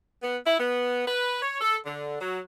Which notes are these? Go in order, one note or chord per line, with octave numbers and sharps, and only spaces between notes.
B3
E4
B3
B4
C#5
A4
D3
F#3